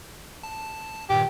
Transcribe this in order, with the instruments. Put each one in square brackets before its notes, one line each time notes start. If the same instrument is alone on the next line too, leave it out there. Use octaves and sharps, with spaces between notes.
[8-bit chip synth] A5
[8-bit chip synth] G2 A#2 D#3 [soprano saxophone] G4